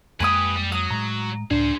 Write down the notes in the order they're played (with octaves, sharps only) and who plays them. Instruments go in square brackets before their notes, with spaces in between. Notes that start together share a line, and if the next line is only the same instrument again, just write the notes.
[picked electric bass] F2 G#3 A#3 [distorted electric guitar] G4 B4 [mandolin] G#5 C6 D#6
[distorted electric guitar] G3
[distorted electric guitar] F#3 [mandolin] D#6
[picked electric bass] A2 G#3 [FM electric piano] A#5
[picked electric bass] C#2 A2 [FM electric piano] D4 [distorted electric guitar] G#4 C5